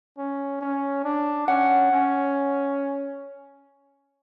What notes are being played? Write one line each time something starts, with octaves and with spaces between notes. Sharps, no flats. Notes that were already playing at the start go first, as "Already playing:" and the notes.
C#4
C#4
D4
C#4 F#5
C#4